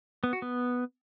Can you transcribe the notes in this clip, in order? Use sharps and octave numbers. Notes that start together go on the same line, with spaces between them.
B3
F#4
B3